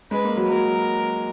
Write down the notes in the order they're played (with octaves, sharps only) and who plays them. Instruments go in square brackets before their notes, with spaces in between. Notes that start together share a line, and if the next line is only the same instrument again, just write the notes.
[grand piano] G#3 [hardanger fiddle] B4
[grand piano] A#3
F#3
[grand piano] F#3 [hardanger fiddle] A#4